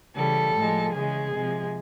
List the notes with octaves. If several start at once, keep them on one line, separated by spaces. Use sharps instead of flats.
C#3 E3 G3 A4
A2 F3 G#3
C#3 E3 G#3 G#4
C3 F3 G#3